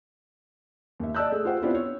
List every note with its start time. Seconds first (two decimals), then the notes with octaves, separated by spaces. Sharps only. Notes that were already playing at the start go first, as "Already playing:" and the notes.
1.00 D#2 E5
1.15 D5 D#5 A5 E6 F#6 G6
1.31 A3 G#4
1.45 F4 G4 C5 F#5 G5
1.62 B3 C4 D4 E4 F4 G4
1.75 C#5